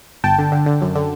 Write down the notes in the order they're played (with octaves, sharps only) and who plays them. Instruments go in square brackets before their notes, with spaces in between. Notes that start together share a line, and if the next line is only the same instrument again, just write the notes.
[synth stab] G1 G5 A5
D3
D3
D3
F#2
D3